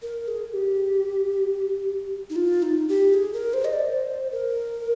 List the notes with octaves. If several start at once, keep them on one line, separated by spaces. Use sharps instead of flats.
A#4
G#4
G4
D#4
F4
D#4
G4
G#4
A#4
C5
D#5
D5
C5
A#4